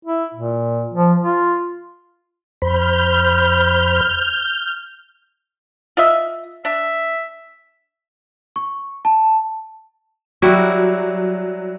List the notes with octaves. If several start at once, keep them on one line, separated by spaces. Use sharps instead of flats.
E4
A#2
F3
F4
F2 C5 B5 F6 G6
F4 D#5 E5
D4 E5
C#6
A5
F#3 G3 E4 F#4